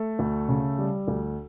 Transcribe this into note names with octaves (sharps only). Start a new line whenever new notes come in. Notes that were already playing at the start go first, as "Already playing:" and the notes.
Already playing: A3 A4
D2
C#3
G3
D2